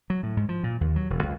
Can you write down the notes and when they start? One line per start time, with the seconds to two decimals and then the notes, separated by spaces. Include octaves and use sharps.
0.10 F#3
0.23 A2
0.37 G#2
0.49 F3
0.64 A#2
0.81 D#2
0.96 F#3
1.10 E1
1.23 C#2